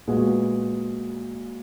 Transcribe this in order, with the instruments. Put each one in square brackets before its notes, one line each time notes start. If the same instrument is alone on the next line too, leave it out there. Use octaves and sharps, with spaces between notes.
[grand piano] A#2 G#3 B3 F#4